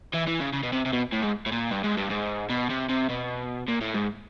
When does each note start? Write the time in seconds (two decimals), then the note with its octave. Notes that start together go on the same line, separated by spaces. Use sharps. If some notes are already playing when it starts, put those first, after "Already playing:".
0.13 E3
0.27 E3
0.40 C#3
0.53 C#3
0.63 B2
0.73 C3
0.86 C3
0.93 B2
1.12 A2
1.22 G#2
1.46 A2
1.52 A#2
1.71 G2
1.84 G#2
1.98 G2
2.11 G#2
2.50 B2
2.70 C3
2.89 C3
3.09 B2
3.68 A#2
3.81 A2
3.94 G#2